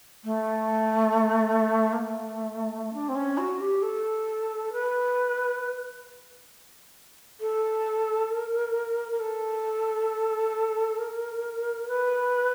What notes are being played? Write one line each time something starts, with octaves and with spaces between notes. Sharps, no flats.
A3
A#3
A3
D4
C4
C#4
F#4
G4
A4
B4
A4
A#4
A#4
A4
A#4
B4